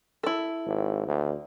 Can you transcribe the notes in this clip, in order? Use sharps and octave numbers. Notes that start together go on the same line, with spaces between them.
E4 A4
G#1
D2